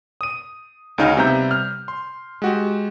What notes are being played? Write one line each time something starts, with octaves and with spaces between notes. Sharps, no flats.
D#6 D#7
D2 C#3 D#4 F5 G#5 F6
C3 G3 B3 E5 A#5 G6
F6
C6
G#3 F#4 G4